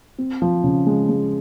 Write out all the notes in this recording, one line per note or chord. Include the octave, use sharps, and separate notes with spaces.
C4
F3
C#3
G#3
G#3